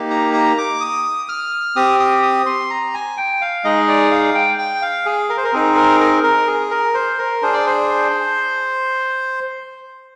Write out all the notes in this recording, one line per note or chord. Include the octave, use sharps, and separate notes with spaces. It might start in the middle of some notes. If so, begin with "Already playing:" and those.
Already playing: A#3 D#4 G4
A#5
A#5
D6
D#6
F6
C4 G4 D#6
D#6
D#6
C6
A#5
G#5
G5
F5
G#3 D#4 G#4 D#5
D5
F5
G5
G5
F5
G#4
A#4
C5
A#4
C4 D#4 G#4
A#4
A#4
A#4
G#4
A#4
C5
A#4
D4 G#4 C5
D5
C5